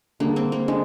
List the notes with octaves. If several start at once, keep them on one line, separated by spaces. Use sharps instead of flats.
D3 G3 A#3 D4 G#4
C4
A#3
D3 G#3